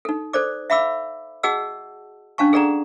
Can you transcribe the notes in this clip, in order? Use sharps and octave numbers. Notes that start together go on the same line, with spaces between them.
D#4 A4
A4 C5 D5 D6
E5 F5 B5 D6 E6
F#4 G#4 D#5 F#5 A5 E6
C#4 D4 F5 A5 C#6
G#4 A4 D5 F#5 A#5